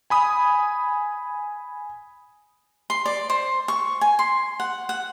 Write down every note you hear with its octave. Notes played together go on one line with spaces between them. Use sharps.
G#5 B5 D#6
C6
D5
C5
C#6
G#5
C6
F#5
F#5